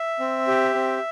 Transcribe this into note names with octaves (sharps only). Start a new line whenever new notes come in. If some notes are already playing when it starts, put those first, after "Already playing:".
Already playing: E5
C4
G4
C4